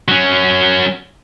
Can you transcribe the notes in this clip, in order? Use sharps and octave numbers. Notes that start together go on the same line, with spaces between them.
F#3 C#4